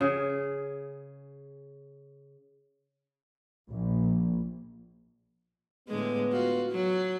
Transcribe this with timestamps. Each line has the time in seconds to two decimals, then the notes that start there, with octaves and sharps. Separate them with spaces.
0.01 C#3 G#4
3.68 A#1
5.88 A2 D3 G#3 B3
6.32 F4 F#4
6.71 F#3